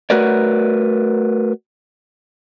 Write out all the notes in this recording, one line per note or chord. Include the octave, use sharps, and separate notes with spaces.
A3 F#4 A#4 B4 C#5 D5